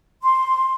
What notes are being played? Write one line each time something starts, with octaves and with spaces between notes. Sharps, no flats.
C6